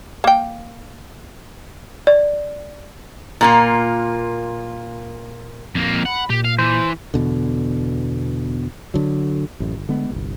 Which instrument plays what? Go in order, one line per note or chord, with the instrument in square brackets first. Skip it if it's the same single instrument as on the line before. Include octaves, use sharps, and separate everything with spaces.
[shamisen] A#3 G5
[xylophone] D5
[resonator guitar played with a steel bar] A#2 A#3 F4
[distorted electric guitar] F2 A#3
[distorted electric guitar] F#5 [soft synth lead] B5
[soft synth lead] A#2 [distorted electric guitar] G4
[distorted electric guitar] F5
[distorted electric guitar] E3 [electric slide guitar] C5
[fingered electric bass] E2 B2 D3
D3 F#3
[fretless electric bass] A1 F#2
G1
D3 G#3 A3 B3
G1 C2